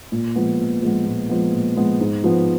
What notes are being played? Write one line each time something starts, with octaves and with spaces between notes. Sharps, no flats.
A#2
F3 G#3 B3
A#2
F3 G#3 B3
A#2
F3 G#3 B3
A#2
F3 G#3 B3
G#2
F3 B3